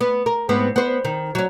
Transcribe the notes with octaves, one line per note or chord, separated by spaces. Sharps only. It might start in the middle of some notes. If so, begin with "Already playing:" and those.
B3
A#4
G#2 B3 C4
B3 C5
D#3
F#3 C#4